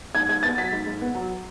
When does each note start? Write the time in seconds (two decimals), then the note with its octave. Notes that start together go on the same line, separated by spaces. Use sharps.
0.15 G#2 G#6
0.29 G#2 G#6
0.43 B3 A6
0.57 F#3 B6
0.72 G#2
0.86 G#2
1.01 B3
1.15 F#3